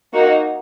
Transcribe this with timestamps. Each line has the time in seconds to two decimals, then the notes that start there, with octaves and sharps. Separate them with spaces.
0.14 A#3 D#4 F#4